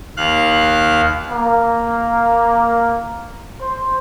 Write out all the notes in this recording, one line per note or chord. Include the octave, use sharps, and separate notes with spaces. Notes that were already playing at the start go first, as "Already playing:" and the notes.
D#2 F5 F#6
A#3
C5